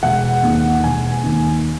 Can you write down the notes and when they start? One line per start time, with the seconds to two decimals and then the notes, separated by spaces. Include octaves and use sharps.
0.03 E1 F#5
0.43 D#2 D#3
0.84 E1 G#5
1.24 D#2 D#3